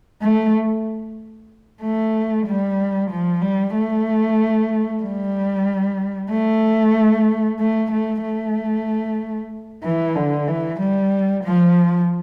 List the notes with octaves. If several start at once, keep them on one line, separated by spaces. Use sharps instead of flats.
A3
A3
G3
F3
G3
A3
G3
A3
A3
A3
A3
E3
D3
E3
G3
F3